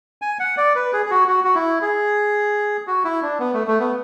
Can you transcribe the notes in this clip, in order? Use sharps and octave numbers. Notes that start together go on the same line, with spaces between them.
G#5
F#5
D5
B4
G#4
G#4
F#4
F#4
F#4
E4
G#4
F#4
E4
D4
B3
A3
A3
B3